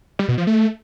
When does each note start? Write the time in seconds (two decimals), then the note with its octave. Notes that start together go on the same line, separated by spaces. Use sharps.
0.19 G3
0.28 B2
0.38 F3
0.47 A3